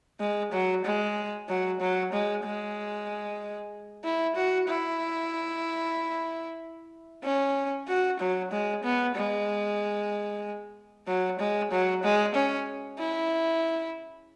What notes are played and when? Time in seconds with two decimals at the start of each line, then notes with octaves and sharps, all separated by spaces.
0.20 G#3
0.52 F#3
0.85 G#3
1.48 F#3
1.80 F#3
2.13 G#3
2.44 G#3
4.04 E4
4.36 F#4
4.68 E4
7.24 C#4
7.88 F#4
8.20 F#3
8.51 G#3
8.84 B3
9.16 G#3
11.07 F#3
11.39 G#3
11.71 F#3
12.03 G#3
12.35 C#4
12.99 E4